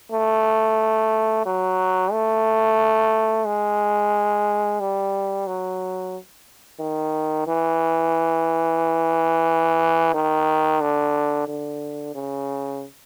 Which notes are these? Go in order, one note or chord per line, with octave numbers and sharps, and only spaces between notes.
A3
F#3
A3
G#3
G3
F#3
D#3
E3
D#3
D3
D3
C#3